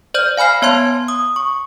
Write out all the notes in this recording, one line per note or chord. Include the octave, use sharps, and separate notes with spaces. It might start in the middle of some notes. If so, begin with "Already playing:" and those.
C5 D5 F6 G6
F5 G#5 B5 F6 C7
B3 C#5 A5 C6 G#6
D#6
C#6